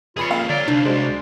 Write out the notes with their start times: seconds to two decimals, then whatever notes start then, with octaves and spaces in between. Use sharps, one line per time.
0.17 F1 F4 G#4 C#5 B5 C#7
0.31 A#2 C#3 F5
0.50 D3 C#5 D5 A#5
0.68 C2 D4 D#4
0.85 F#3 G#3 C5 D5